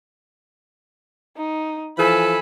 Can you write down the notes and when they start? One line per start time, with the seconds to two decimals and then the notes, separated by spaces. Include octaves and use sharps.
1.37 D#4
1.98 E3 F3 A4 G#5 B5